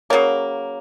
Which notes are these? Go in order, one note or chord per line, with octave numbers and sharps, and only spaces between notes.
C#3 F#3 A#3 C#5